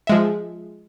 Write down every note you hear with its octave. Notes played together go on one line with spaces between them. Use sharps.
F3 G#3 E5